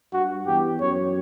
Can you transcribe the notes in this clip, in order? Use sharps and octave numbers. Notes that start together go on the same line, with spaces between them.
G2 F#4
E2 G4
F#2 C#5